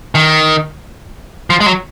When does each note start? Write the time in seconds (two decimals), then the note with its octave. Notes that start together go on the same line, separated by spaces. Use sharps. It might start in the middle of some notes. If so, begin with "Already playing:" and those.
0.15 D#3
1.50 F3
1.60 G#3
1.66 F#3